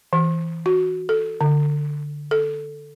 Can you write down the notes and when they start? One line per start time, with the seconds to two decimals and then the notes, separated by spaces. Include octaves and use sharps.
0.13 E3
0.66 F#4
1.09 A4
1.41 D3
2.31 A4